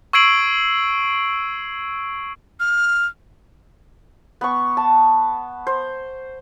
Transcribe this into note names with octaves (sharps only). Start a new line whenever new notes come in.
C#6 E6 G#6 C7 D7 F#7
F6
B3 C#6
A5
C5